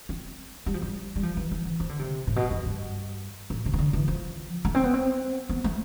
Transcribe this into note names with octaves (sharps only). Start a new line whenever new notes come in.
C4
G3
F3
G3
G3
F3
E3
E3
E3
F3
D3
C3
A2
B2
F2
G2
A2
C3
E3
D3
E3
F3
A3
C4
B3
C4
B3
A3